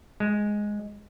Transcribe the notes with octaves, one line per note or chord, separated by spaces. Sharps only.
G#3